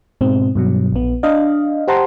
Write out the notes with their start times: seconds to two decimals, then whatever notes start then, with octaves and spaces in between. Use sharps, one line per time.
0.21 G#2 B2 C4
0.55 G2 B2 F#3
0.93 A#1 B3
1.23 D4 D#5 F5
1.88 G4 C5 F#5 A5 A#5 C6